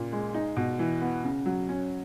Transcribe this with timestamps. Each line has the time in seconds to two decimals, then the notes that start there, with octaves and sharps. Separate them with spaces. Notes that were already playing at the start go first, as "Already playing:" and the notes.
Already playing: A#2 C#3
0.12 G#3
0.34 D#4
0.56 B2
0.79 E3
1.01 B3
1.24 C#3
1.46 F#3
1.69 C#4